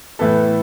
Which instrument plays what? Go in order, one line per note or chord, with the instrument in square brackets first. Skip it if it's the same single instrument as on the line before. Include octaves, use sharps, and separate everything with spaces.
[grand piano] A2 E3 B3 A4